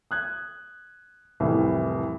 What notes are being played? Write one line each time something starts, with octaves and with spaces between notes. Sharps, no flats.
D#6 F#6 G#6
C2 F2 A2 E3